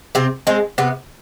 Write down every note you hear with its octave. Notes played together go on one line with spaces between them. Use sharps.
C3 C4
G#3 C4
C3 B3